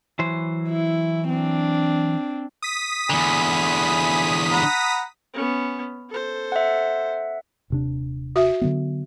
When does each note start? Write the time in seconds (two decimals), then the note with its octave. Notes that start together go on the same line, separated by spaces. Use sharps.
0.19 E3 F#3 C5
0.68 E4
1.29 C4 D4
2.62 D#6 B6
3.10 E2 D3 G#5 B5
4.52 F#5 A#5 B5
5.33 B3 C#4
6.09 A4 C5
6.52 E5 F#5
7.70 D#1 C3 D4
8.36 F#4 E5
8.61 D3 F#3 B3